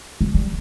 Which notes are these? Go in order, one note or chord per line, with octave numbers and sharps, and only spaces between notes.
G#3
G3